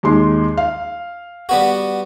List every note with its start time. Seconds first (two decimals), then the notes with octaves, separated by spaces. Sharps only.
0.03 D#2 G#3 C6
0.57 F5
1.49 G3 B3 F#4